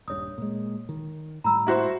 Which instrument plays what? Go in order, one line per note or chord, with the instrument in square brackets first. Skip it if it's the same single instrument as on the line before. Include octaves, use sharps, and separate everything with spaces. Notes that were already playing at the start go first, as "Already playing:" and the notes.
[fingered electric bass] D#1 G2 [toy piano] C#5 D#6
[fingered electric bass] A#2 G#3
D#3
[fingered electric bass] A2 G3 [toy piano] A#5 B5 E6
[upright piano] E4 F#4 C5